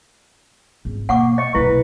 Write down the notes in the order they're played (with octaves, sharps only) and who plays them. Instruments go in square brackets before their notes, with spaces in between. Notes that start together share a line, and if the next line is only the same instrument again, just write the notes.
[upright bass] G#1
[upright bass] B2 [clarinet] A#3 [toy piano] F#5 C#6 D6
[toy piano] D#5 [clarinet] C#6
[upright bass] B1 C3 [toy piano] E4 [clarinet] B4